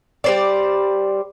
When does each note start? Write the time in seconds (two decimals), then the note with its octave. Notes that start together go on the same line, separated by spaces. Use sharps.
0.24 G3 C5 D5